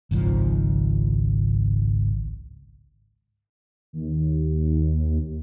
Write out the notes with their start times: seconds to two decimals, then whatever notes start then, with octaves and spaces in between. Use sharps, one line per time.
0.11 G#1 C#2 G#2 F3
3.93 D#2